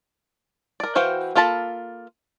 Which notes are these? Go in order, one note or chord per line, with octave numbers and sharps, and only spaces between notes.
A#4 D5
E3 F#4 C5 F5 G5
A#3 F4 A4 A5 B5